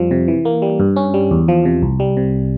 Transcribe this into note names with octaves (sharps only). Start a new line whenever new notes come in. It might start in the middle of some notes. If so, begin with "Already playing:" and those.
Already playing: F2 F3 G3
C3
E3
A#3
G3
G2
C#4
G3
E2
F3
C3
C2
G3
C3